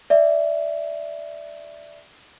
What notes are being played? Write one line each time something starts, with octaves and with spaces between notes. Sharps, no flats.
D5 E5